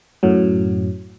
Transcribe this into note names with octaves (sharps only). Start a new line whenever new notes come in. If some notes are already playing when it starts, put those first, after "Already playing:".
F#2 A2 F#3